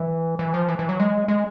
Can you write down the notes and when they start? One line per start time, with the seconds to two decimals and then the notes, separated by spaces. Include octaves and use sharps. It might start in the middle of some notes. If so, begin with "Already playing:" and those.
Already playing: E3
0.39 E3
0.54 F3
0.68 E3
0.79 E3
0.89 F#3
1.00 G#3
1.28 G#3